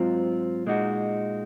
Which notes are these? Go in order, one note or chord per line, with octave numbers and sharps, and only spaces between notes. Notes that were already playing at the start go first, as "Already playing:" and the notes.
Already playing: G#2 F#3 C4 F4
A#2 G#3 D#4 F#4